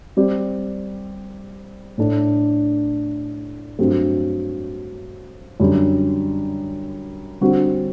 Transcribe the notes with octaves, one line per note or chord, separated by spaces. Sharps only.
G3 C4 G4 D5
A2 A3 D4
G2 F#3 A3 C4 G4
F#2 D3 G3 D4
D3 G3 C4 F#4